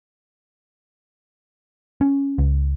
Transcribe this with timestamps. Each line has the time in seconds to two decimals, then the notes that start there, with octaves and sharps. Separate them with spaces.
2.01 C#4
2.38 C#2